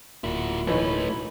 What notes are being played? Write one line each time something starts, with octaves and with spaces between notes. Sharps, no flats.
D1 A#2 E4 F#4
B1 E3 A3 D#4 B4 C#5